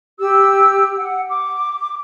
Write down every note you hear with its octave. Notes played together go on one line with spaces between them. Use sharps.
G4 E6
F#5
D6